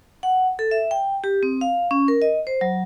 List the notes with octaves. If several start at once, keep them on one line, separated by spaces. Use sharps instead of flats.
F#5
A4
E5
G5
G4
C4
F5
C#4
A#4
D#5
C5
F#3